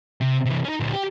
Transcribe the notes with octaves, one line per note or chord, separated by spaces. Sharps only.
C3
C3 E3
C#4 D#4
D2 A#2
G4